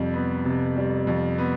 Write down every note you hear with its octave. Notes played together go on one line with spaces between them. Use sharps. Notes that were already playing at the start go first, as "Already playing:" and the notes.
Already playing: F2 C3 G3
B3
C3
G3
F2
B3